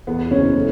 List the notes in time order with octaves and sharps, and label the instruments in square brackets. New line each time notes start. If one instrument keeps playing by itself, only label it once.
[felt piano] E2 [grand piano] B3
[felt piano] F#1 [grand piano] C#4
[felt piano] A2